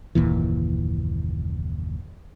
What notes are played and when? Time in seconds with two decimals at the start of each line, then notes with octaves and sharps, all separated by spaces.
0.15 F#1 D#2 A#2 E3